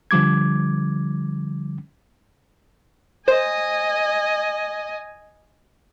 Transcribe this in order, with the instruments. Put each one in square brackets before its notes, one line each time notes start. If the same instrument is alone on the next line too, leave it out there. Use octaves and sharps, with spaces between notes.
[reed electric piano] D3 F3 G3 D6 G#6
[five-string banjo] C5 [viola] D#5 G#5